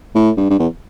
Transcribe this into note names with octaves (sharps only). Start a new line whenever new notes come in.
A2
G2
G2
E2